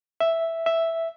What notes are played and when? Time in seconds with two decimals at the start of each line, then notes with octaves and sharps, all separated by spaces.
0.20 E5
0.66 E5